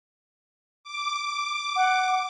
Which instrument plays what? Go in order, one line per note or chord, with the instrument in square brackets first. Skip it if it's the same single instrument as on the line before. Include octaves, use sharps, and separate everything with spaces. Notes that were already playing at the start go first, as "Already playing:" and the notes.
[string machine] D6
[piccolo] F#5